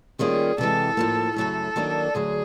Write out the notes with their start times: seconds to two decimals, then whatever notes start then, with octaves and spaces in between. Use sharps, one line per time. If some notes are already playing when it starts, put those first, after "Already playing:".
0.19 D#3 G3 A#3 C#4 F4 G#4
0.58 C3 E3 G#3 A4
0.97 A2 F3 A#3
1.36 F#2 C#3 F#3 A3 A4
1.76 D#3 F#3 A#3 D4
2.14 D2 D3 F#3 G#4